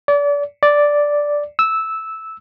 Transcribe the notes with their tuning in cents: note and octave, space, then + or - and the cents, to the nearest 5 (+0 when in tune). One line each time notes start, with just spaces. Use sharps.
D5 -35
D5 -5
E6 -10